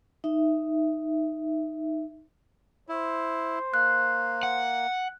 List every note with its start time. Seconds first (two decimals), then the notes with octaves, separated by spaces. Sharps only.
0.24 D#4 E5
2.89 E4 C5
3.74 A#3 F#6
4.43 F#5